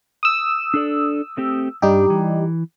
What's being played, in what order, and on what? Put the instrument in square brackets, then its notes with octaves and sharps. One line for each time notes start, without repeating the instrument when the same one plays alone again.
[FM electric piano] D#6 E6
[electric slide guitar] D4 A4 D5
A3 C4 G4
[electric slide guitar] G2 D4 [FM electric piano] G3 D#4 G4
[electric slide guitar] E3